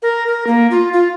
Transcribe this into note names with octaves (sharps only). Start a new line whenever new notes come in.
A#4
A#4
A#3
F4
F4